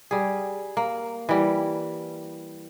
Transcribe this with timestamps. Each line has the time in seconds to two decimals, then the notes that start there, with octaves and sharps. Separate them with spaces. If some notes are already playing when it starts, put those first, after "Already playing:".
0.11 G3 G#4
0.77 A#3
1.29 E3 G3